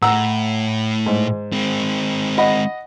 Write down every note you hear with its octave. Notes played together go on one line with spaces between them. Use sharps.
A2 F#5 A#5 E6
G#2
G#3 C4
D#5 F#5 B5